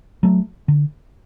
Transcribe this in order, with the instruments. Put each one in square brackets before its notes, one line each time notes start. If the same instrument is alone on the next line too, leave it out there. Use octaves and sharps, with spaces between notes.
[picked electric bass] F#3 A3
D3